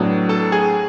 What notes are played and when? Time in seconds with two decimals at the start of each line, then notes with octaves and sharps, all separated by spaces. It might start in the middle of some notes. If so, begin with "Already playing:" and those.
Already playing: A2 F#3 B3 D4
0.29 A4 A5
0.52 G#4 G#5